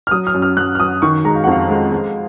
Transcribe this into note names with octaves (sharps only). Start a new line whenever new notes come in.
F6
F#3 D#6
F6
F#2
F6
F#2 F#6
F6
F#2 D#6
D#3 C#6
G#3 A#5
F5
F#5
F2 F5
G#3
G#3